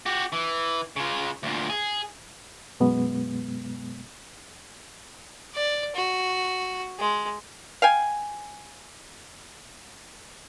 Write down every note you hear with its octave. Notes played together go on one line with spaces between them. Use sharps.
F#4 G4
E3
C#3 F4
D2 A#2
G#4
F#2 B2 G#3 B3
D5
F#4
G#3
F5 G5 G#5